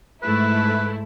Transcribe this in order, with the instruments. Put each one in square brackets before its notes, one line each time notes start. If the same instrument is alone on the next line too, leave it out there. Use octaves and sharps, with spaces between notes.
[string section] G#2 A3 E4 [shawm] B4